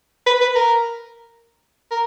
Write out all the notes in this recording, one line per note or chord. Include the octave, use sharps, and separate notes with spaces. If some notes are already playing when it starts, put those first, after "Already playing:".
B4
B4
A#4
A#4